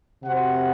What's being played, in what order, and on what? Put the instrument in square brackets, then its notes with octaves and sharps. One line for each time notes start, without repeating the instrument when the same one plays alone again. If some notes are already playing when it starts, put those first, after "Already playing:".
[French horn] C3 [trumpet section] F#4 C5 F#5